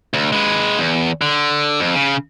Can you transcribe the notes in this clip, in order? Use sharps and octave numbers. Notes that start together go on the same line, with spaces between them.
D2
G#3 B4
E2
D3
F2
C#3